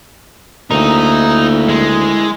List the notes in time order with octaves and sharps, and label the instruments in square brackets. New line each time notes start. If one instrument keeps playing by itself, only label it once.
[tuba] D2 [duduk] A#3 [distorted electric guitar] D#4 [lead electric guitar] E4 A#4
[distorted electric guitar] G#3